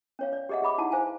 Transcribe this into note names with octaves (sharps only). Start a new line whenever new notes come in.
C#4 C#5 F5
D5
G4 G#4 D#5 E5 F#5
G#4 E5 B5 D6
D#4 E4 F#5 A5
C5 F5 G#5 A5